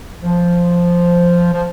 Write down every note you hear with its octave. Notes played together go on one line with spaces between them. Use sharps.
F3
F3